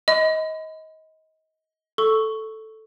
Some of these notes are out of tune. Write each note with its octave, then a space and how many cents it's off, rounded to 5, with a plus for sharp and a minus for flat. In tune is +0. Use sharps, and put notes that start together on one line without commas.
D#5 +25 B5 +35
A4 +0 C#6 +0